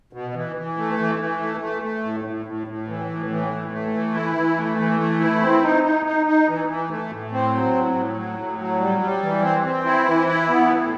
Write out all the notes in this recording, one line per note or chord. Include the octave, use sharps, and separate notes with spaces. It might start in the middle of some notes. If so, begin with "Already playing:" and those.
B2
E3
E3
A3
E3
E3
A3
A3
A3
A2
A2
A2
A2
E3
A2
E3
A2
A3
E3
E4
E3
A3
E3
A3
E4
C4
D#4
D#4
D#4
D#4
E3
E3
A3
A2
C4
F#3
A2
A2
F#3
A2
F#3
G3
G3
E3
C4
C4
E4
E3
E4
B3
A2